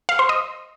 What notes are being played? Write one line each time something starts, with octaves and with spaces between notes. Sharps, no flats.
F5
C5
D#5